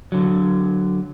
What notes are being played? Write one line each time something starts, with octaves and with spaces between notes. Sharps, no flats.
D3 F#3